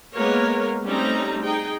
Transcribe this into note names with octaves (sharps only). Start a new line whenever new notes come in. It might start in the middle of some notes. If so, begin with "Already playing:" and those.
G#3 A#3 B3 A#4 C#5
G3 A3 C4 C#4 D#4 A#5
D#4 G#4 G5